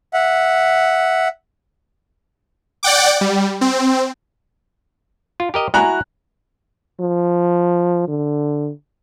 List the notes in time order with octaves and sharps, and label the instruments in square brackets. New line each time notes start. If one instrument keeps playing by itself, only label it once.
[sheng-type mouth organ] E5 F#5
[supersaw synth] D5 F#5 G5 D6
G3
C4
[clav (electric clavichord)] F4
G4 A#4 D#5
[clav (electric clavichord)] E4 F#4 [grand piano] G#5 A#5 F#6
[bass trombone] F3
D3